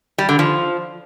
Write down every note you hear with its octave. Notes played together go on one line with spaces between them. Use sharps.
G3
D3
F3